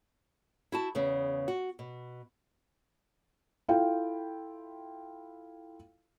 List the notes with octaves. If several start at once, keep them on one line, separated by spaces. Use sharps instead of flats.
E4 F#4 A5
E2 C#3 B3
F#4
B2
E4 F4 A4 F5 G5